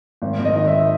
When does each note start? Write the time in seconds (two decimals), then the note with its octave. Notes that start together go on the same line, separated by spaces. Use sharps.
0.22 G#1
0.39 G#1
0.45 D#5
0.56 D#3
0.67 E5